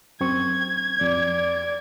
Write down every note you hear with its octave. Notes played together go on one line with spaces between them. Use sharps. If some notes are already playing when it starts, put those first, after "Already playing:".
F#2 C4 C#6 G#6
F2 D5